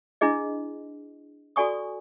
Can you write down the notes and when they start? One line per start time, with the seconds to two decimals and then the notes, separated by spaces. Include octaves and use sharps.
0.21 D4 E4 G#4 D#5
1.56 F#4 A4 D5 G#5 C#6 D#6